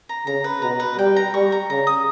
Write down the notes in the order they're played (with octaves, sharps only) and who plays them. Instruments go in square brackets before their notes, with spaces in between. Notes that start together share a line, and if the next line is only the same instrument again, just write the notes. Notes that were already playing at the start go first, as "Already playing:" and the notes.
[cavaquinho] A#5
[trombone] C#3 [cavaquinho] A#5
[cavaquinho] B4
[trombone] B2 [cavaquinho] A#5
[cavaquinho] B4
[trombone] G3 [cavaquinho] G5
[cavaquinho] A#5
[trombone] G3 [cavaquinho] C#6
[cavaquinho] A#5
[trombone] C#3 [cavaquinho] A#5
[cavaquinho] D#6